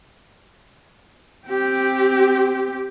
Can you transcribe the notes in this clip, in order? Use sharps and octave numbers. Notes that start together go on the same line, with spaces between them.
C4 G4